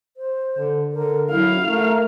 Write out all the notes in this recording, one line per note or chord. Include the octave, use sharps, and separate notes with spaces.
C5
D3
D3 A#4
F#3 E4 F5
A3 A#4